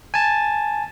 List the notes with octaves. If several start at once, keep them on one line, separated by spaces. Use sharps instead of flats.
G#5 A5